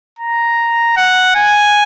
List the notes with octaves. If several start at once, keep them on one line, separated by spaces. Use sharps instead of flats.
A#5
F#5
G#5